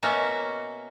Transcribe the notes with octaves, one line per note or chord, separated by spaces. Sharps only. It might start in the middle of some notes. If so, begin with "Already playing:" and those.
B2 A#3 C#4 F#4 E5